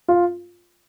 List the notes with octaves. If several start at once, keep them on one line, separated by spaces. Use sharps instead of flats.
F4